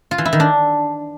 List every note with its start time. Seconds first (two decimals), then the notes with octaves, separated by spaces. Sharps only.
0.11 F4
0.18 E3
0.25 E4
0.33 D#3
0.40 D4